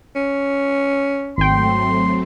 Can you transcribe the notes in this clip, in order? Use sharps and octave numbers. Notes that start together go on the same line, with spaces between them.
C#4
G#1 F#3 A3 C4 G5 C6